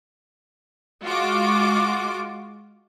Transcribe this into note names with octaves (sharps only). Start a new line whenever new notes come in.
G#3 F4 F#4 D6